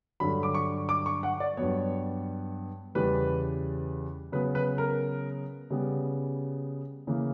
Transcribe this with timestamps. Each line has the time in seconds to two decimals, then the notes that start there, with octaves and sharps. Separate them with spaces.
0.20 G2 D3 F#3 B5
0.43 D6
0.54 C#6
0.89 D6
1.06 C#6
1.23 F#5
1.40 D5
1.57 G2 F#3 B3 C#5
2.95 E2 C#3 G3 B4
4.32 C#3 F#3 B3 B4
4.55 B4
4.78 A#4
5.70 C#3 G3 B3
7.07 C#3 E3 A#3